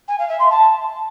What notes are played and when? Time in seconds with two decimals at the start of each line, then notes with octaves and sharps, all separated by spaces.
0.08 G#5
0.18 F5
0.29 E5
0.39 C6
0.50 A5